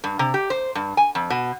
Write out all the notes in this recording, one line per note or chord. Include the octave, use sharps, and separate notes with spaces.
G2
C3
G4
C5
G2
G#5
F2
B2